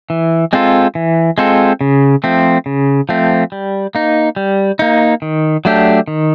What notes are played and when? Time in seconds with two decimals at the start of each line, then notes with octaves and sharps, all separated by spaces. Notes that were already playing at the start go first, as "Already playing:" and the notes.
0.10 E3
0.53 G#3 C4 F4 A4
0.95 E3
1.38 G#3 C4 F4 A4
1.81 C#3
2.24 F3 A3 C4
2.66 C#3
3.09 F3 A3 C4
3.52 G3
3.95 A#3 D#4
4.36 G3
4.79 A#3 D#4
5.22 D#3
5.65 F#3 A3 D4 G4
6.08 D#3